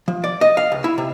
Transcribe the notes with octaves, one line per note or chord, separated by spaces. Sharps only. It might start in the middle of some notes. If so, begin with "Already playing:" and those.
F3
D5
D#5
F5
C#2
E4
C3